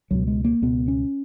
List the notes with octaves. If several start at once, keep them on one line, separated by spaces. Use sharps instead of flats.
C#2 B2 F#3
G#3
A#3
C#2 B2 B3
C#4